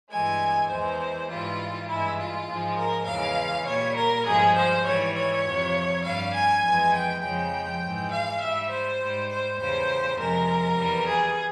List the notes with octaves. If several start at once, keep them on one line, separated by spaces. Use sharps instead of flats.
G2 E3 G#3 G#5
E2 E3 G#3 C5
G#2 E3 G3 F4
G2 E3 G#3 E4
F4
G#2 F3 G#3
A#4
E2 C#3 E3 G#3 F5
A#2 G3 C#5
A#4
G2 F3 G#3 G#4
C5
G#2 E3 G3 C#5
C#5
F2 C3 F3
G2 G3 F5
G#5
F2 E3 G#3
G5
F2 C#3 F3 G#3 G5
G#2 E3 G#3
F5
G#2 G3 E5
C5
G#2 G3
C5
E2 C#3 G3 C5
F2 C3 F3 G#3 A#4
E2 E3 G3
G#4